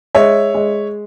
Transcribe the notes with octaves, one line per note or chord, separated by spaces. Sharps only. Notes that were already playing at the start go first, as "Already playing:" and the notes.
G#3 C#5 E5
G#3